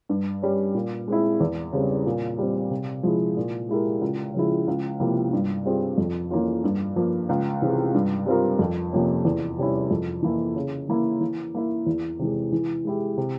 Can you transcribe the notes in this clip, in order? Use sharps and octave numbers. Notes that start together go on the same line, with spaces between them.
G2
G3 C#4
A#2
G#3 C4 E4
E2
C#3 G3 C4
A#2
G3 C4
C3
F3 G#3 E4
A#2
G#3 E4 G4 A#4
C#2
C#3 F3 G#3 E4
C#2
C3 F3 A#3 E4
G2
G3 C4 F4 G#4
F2
E3 A#3 C#4 F4
G2
F3 A#3
C#2
C3 E3 G#3 C4
G2
G3 C4 F4 A#4
F2
C3 F3 A#3 C#4
E2
C3 G3 C#4 E4
F2
E3 A#3 E4
C#3
E3 A#3 E4
E3
A#3 E4
E2
C3 E3 G#3
E3
G#3 E4 G4
C3